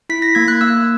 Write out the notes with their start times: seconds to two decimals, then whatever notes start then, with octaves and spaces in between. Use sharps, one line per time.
0.09 E4 B6
0.22 A#6
0.35 A#3 G#6
0.48 F#6
0.61 A#3 E6